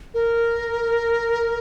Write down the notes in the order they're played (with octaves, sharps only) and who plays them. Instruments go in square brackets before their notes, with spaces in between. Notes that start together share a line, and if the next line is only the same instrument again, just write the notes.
[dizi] A#4